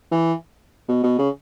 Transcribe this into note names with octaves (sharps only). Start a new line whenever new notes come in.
E3
B2
B2
C#3